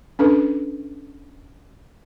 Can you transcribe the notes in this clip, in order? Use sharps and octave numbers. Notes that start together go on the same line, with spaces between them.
C#4 D4 A4 B4